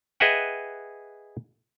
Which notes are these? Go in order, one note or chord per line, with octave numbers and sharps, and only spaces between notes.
G#4 B4 D#5 E5 F#5 G5